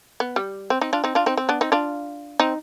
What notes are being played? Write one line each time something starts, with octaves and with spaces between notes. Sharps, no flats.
B3
G3
C4
C4 D#4
D4 F4
C4 D#4
D4 F4
C4 D#4
C4
B3 D4
C4 D#4
D4 F4
C4 D#4